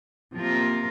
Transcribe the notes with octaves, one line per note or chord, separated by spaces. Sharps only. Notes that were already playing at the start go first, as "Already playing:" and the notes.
C3 F3 A#3 F4 A#4